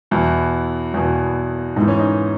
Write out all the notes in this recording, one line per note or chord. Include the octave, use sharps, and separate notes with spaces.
E2 B2 E4
E2 B2
G#2 E3 D#4
C#4
D#4